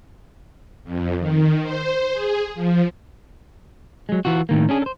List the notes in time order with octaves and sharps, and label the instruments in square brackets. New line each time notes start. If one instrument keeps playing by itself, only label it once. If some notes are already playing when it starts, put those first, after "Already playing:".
[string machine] F2
D#3
C5
G#4
F3
[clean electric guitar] F#3 G#3
E3 F4 F#4
A2 D#3 A#3
C#4 D4 G#4
A4 C5